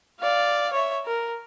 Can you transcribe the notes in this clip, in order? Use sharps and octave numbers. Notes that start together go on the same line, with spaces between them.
D5 F5
C#5 E5
A#4